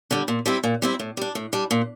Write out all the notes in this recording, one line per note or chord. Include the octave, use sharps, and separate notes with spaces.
D3 G3
A#2
G3 C4 E4
A#2
G3 C4 E4
A2
G3 D4
A2
G3 D4
A#2